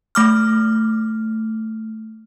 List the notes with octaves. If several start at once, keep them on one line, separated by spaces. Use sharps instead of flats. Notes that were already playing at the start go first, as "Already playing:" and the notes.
A3 D6 F6